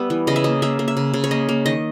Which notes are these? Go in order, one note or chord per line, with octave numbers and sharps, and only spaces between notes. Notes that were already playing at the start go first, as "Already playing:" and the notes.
Already playing: G3 B3 E5
E3
C#3 D#5
E5
A#3 D#5
A#3 E5
A#3
E5
C#3
C#3
C#5
A#3 D#5
A#3
D#3 D#5